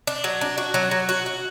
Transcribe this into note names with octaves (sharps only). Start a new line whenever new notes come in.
D4
F#3
D4
F#4
F#3
F#3
F#4
F#4